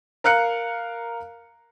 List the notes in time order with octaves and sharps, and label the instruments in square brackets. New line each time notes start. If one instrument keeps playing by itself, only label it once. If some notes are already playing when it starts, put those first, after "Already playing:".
[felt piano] A#4 F5 F#6 C#7